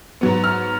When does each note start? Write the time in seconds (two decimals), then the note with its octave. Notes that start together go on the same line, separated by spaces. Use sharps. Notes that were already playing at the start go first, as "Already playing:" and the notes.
0.21 G#2 F#3 B3
0.44 F6